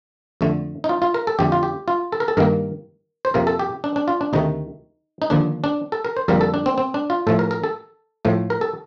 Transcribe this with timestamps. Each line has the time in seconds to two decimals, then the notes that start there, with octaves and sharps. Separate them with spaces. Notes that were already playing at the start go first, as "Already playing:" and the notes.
0.41 F2 D3 A3
0.84 D#4
0.89 F4
1.02 F4
1.14 A#4
1.27 A4
1.39 F2 D3 A3 G4
1.52 F4
1.63 G4
1.88 F4
2.12 A4
2.20 A#4
2.28 A4
2.37 G2 D#3 A#3 A#4
3.25 C5
3.34 F2 C3 F3 A#3 A#4
3.47 A4
3.59 G4
3.84 D4
3.96 D4
4.08 F4
4.21 D4
4.33 D2 C3 D#3 A3 D#4
5.22 D#4
5.30 D#2 D3 F3 D4
5.64 D4
5.92 A4
6.05 A#4
6.17 C5
6.28 F2 D3 G3 A#3 A#4
6.41 A4
6.54 D4
6.66 C4
6.78 C4
6.94 D4
7.10 F4
7.27 A2 F3 A3 A4
7.39 A#4
7.51 A#4
7.64 A4
8.25 A2 F3 A3
8.50 A#4
8.61 A4